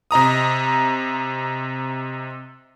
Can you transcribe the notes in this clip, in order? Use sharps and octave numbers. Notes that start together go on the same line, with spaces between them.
C3 D#5 A#5 D#6